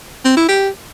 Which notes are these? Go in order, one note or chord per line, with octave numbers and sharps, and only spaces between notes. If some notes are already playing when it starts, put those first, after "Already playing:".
C4
E4
G4